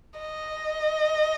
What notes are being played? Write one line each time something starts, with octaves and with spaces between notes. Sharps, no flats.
D#5